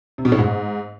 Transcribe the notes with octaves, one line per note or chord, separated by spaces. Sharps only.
C3
B2
A2
G#2